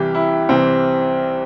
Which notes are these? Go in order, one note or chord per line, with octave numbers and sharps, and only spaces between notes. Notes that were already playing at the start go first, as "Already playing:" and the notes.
Already playing: C2 C3 E3 G4
E4
C2 C3 E3 C4